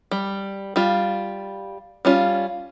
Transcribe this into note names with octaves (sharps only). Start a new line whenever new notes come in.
G3
G3 F4
G3 C#4 F4